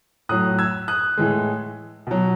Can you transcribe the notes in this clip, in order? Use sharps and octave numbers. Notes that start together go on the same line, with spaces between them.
A2 F#3 D#6 F#6
E6 G#6
D#6 F#6
A2 E3 G#3
B2 F#3